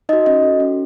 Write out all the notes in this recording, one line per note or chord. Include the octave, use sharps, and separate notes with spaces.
D#4 F#4 D#5
C#4 D#5
F#4 A4
C#4